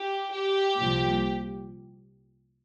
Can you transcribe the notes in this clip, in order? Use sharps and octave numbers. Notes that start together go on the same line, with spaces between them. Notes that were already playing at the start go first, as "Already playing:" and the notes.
Already playing: G4
G4
C2 A#2 F3